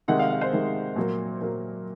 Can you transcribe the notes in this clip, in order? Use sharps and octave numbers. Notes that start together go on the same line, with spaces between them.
C3 D#3 G#3 F#5
F5
F5
C5
C3 D#3 G#3
A#2 F#3 A#3
A#2 F#3 A#3 A#4